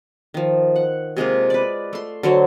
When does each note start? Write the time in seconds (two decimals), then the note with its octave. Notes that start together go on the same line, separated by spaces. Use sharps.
0.34 D#3 F3
0.76 F#5
1.17 C3 G#3 A#3 F4
1.50 B4 D5
1.93 A3 C6
2.23 D3 F#3 C5 C#5